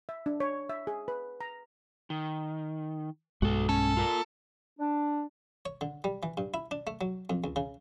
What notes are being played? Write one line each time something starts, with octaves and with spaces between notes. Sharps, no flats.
E5
D4
C#5
E5
G#4
B4
A#5
D#3
B1 G2 G#3 F#4 A4
C#4 A4
F4 A#4
D4
C#5
D3
G3
E3
G2
E4
D4
A3
F#3
F2
C#2
C#3